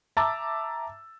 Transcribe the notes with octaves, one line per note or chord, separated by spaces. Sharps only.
E5 A5 A#5 D6 E6 A6